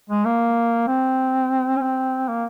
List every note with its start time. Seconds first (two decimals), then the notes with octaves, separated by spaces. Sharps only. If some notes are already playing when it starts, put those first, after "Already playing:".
0.10 G#3
0.25 A#3
0.88 C4
1.77 C#4
1.81 C4
2.28 A#3